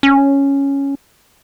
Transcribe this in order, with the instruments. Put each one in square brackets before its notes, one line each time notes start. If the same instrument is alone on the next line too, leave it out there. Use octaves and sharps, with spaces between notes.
[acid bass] C#4